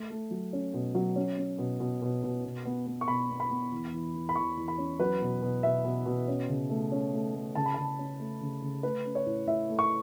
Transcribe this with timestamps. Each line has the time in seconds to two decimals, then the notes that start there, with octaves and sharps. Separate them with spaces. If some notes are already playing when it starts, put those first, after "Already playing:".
Already playing: A3
0.10 A3
0.31 F#3
0.53 C#4
0.74 B2
0.95 F#3
1.16 C#4
1.38 C#4
1.58 B2
1.80 B2
2.02 B2
2.23 B2
2.45 B2
2.65 B3
2.87 B3
3.01 C#6
3.08 B2 B5
3.30 B3
3.40 B5
3.50 B3
3.72 E2
3.93 E3
4.14 E2
4.29 B5
4.36 E2 C#6
4.57 E2
4.68 B5
4.78 C#4
5.00 F#3 B4
5.22 B2
5.42 B2
5.63 B2 E5
5.84 B2
6.06 B2
6.28 C#4
6.48 C#3
6.70 A3
6.92 C#4
7.13 A3
7.34 A3
7.55 C#3 A5
7.66 B5
7.74 C#3 A5
7.99 C#4
8.19 A3
8.41 C#3
8.62 C#3
8.83 A3 B4
9.05 C#4
9.15 C#5
9.26 A2
9.47 A2 E5
9.69 A3
9.79 C#6